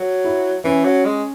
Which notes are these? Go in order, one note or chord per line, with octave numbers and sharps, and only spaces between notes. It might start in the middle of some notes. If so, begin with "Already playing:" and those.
Already playing: F#3
E4
E3 C#4
F#3
G#3